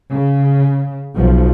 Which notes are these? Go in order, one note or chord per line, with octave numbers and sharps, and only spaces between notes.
C#3
B1 F3